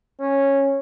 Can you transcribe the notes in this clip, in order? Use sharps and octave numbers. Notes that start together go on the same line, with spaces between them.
C#4